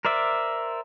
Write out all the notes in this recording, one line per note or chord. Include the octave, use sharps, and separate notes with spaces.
A#4 C5 D5 E5